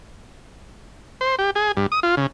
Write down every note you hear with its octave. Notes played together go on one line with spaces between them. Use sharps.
C5
G4
G#4
G2
D#6
F4
C#3